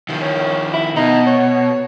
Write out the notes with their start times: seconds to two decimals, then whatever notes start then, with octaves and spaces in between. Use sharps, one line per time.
0.09 D#3 F3
0.21 C#4
0.74 E4
0.96 B2 D#4
1.27 C#5